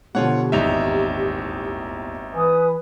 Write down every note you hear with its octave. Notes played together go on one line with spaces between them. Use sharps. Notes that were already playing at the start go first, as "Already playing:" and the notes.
B2 D3 F3 F4 G4 C#5 F#5
D#1 G#1 E2 D#4 E5 F7
E3 B4 G#5 D#6